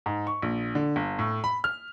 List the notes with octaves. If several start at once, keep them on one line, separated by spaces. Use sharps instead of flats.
G#2
C#6
A#1
D3
G1
A2
B5
F6